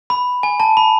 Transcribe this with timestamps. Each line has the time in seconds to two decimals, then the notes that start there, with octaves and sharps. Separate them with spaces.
0.10 B5
0.43 G#5
0.60 A5
0.77 B5